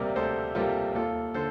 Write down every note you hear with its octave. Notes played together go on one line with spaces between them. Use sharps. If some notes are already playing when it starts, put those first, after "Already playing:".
Already playing: D2 C3 G3 A#3 A#4 D5
D2 A4 C5
C3 G3 A#3 F4 A4
D#2 F4 A4
D3 A4 C5